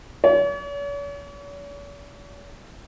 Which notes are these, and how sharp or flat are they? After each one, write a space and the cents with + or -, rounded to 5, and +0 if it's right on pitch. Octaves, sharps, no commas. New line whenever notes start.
C#5 +45